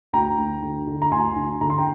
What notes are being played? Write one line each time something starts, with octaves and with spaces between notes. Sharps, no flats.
D2 G5 A#5
D2
D3
D3
A#5
D2 G#5 C6
D3
D3 A#5
C6
G5 A#5